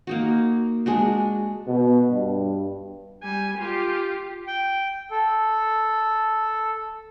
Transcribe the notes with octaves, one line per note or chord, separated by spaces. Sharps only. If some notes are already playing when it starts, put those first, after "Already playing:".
A#3 D#4 F#4
G#3 D4 F#4
B2
G2
G3 G#5
F4 G4
G5
A4